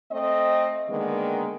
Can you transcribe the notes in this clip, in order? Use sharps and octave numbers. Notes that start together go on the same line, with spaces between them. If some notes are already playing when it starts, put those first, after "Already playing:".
A3 C4 D#5
D3 D#3 G#3 A#3 B3